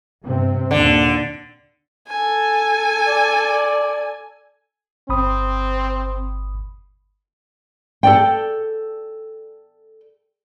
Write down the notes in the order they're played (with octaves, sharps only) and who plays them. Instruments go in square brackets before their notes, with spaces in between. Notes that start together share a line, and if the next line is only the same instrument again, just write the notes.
[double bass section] G2 C3 C4
[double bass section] D#2 A#2 [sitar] D3
[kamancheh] A4 G#5
[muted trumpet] D5
[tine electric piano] G1 B5 D#6 [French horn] C4
[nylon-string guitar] A4 D5 G5